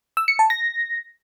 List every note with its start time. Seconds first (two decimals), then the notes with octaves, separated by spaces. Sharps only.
0.17 E6
0.28 C#7
0.39 A5
0.50 A#6